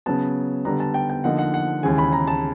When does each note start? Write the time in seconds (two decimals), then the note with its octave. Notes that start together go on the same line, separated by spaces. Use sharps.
0.06 C#3 F#3 B3 A5
0.65 D3 G3 B3 A#5
0.80 A5
0.94 G5
1.09 G5
1.24 D3 F3 A#3 D#4 F#5
1.39 F#5
1.54 F#5
1.83 D#2 C#3 E3 G#3 G#5
1.98 B5
2.13 A#5
2.27 A5